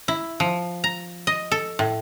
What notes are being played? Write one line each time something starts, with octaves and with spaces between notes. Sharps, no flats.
E4
F3
A#5
D#5
A4
A2